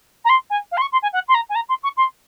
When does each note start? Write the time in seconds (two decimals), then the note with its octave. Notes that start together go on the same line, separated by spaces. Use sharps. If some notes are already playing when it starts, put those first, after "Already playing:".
0.25 A#5
0.29 C6
0.50 G#5
0.71 F5
0.77 C6
0.81 C#6
0.92 C6
1.02 G#5
1.13 F#5
1.28 C6
1.34 A#5
1.49 G#5
1.55 A#5
1.69 C6
1.83 C#6
1.97 C6